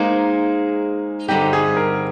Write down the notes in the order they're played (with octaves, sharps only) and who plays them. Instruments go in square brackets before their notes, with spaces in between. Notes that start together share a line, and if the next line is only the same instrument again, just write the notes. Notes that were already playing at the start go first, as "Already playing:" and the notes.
Already playing: [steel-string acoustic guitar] G#3 D#4 G#4 C5 [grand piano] A#3
[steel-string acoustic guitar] G2 D3 G3 C4 D#4 [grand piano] G4
[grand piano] G#4
A#4